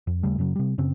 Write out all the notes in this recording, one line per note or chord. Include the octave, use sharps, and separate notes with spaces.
F2
D#2 C#3 G3 A3
F#2 C#3 F#3
C3 G3
F#2 C#3 C4